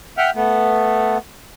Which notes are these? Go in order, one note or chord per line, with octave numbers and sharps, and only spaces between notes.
E5 F#5 G5 F6
A3 B3